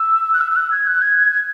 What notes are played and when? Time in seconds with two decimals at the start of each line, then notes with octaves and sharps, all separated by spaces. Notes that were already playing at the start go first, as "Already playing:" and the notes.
Already playing: E6
0.33 F#6
0.41 E6
0.51 E6
0.56 F#6
0.71 G#6
0.87 F#6
1.02 G#6
1.17 G#6
1.32 G#6